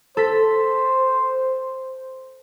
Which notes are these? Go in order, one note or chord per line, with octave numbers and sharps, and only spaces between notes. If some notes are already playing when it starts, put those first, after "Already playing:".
A4 C5 B6